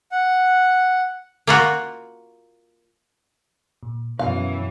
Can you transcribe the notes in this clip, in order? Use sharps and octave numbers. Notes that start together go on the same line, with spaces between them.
F#5
A#3 F4 F#4
A#2
F#2 B2 E3 F5